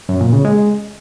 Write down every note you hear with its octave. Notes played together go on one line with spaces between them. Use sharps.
F#2
A#2
C#3
G#3